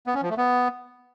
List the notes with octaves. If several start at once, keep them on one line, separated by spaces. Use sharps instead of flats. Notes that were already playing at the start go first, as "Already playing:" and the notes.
B3
C#4
F3
A3
B3